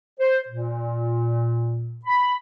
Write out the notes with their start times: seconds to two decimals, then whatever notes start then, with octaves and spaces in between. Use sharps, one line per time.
0.20 C5
0.48 A#2
2.05 B5